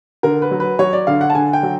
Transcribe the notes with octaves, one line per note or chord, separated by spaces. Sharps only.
D3 A#4
B4
F#3
B4
F#3 C#5
D5
D3 F5
F#5
A5
D3 G#5
G5
F#3